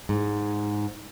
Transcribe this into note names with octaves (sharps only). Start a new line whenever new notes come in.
G#2